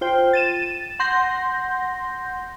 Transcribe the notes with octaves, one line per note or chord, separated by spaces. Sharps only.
F4 C5 G5
A6 D#7 E7
F#5 C6 G6 A#6